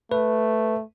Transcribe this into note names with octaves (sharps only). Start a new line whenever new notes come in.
A3 B4